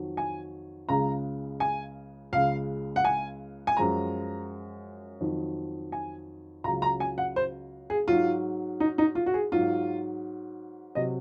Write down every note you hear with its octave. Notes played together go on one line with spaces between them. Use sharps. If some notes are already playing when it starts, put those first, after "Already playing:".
Already playing: F2 D#3 F#3
G#5
C#2 C#3 G#3 A#5
G#5
C#2 C#3 G#3 F5
F#5
G#5
G#5
F#2 F3 G#3 A#5
F2 D#3 F#3
G#5
C#2 C#3 F#3 A#5
A#5
G#5
F#5
C5
G#4
G#2 F#3 F4
D#4
D#4
F4
F#4
G#4
G#2 F#3 F4
C3 F#3 D#5